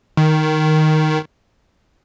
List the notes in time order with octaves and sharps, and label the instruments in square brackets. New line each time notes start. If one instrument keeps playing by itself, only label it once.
[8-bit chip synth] D#3